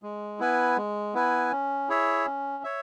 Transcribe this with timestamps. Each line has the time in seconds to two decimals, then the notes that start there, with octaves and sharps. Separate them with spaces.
0.03 G#3
0.40 B3 E4 B4 G#5
0.77 G#3
1.14 B3 E4 B4 G#5
1.52 C#4
1.89 E4 G#4 C#5 E5
2.26 C#4
2.64 C#5 E5